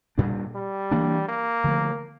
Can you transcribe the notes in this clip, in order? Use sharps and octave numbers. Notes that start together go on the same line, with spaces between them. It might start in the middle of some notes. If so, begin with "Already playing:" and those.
A#2 G3 D4
G3
E3 A#3 D4
A#3
D3 F3 A3